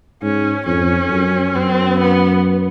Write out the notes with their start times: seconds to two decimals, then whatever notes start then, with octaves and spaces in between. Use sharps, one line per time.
0.22 G#2 C#4
0.66 F2 C#4
1.10 F#2
1.56 F#2 C4
1.99 B3